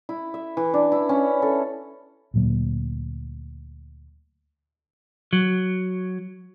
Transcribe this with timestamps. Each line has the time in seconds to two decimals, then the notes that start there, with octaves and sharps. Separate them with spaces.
0.09 E4
0.34 E5
0.57 E3
0.74 D4
0.92 E4
1.09 C#4
1.42 A4
2.34 D2 A#2 F#3 A#3
5.33 F#3